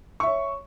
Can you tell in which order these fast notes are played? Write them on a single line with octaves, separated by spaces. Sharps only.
C#6 E5 C#5